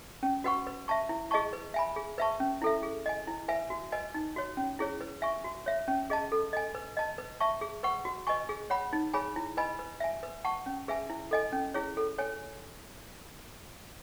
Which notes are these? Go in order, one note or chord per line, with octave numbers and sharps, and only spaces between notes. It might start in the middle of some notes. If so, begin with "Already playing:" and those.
C#4
F#4 B4 F#5 C#6
B4
E5 A5 C#6
E4
G#4 D#5 A5 C#6
B4
E5 G#5 B5
G#4
B4 E5 A5 C#6
C#4
E4 A4 E5
G#4
D#5 G#5
E4
B4 E5 G#5
F#4
B4 D#5 G#5
D#4
F#4 C#5
C#4
E4 G#4 C#5
B4
E5 G#5 C#6
F#4
C#5 E5
C#4
G#4 D#5 A5
A4
D#5 G#5
B4
D#5 A5
B4
E5 A5 C#6
G#4
B4 F#5 C#6
F#4
B4 D#5 G#5 C#6
G#4
C#5 F#5 B5
D#4
G#4 C#5 G#5 B5
E4
B4 D#5 G#5 B5
B4
E5 G#5
B4
F#5 A5 C#6
C#4
G#4 B4 E5 G#5
E4
A4 D#5 G#5
C#4
E4 G#4 C#5
A4
C#5 G#5